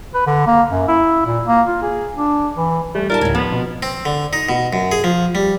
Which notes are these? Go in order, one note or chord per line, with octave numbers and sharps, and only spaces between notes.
B4
D3
A#3
F#2
E4
A#2
A#3
F4
G#4
D4
E3
G3 A3
D#4 F4 A#4 D5 E5 A5
D2 A2 C#3 G#6
F3 B3 F4
B2
C4
D3
D#4
B2
F#2
G#4
F3
G3